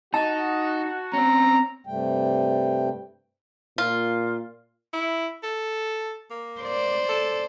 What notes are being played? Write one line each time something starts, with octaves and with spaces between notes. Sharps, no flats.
D#4 F#4 A5
C4 C#4 A#5
G2 C3 G3 A3 G5
A#2 F4
E4
A4
A#3
C5 D5
A4